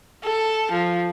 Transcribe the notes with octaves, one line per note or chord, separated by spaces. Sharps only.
A4
F3